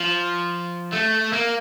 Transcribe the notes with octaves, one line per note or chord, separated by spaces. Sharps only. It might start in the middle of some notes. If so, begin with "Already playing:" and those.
Already playing: F3
A3
A#3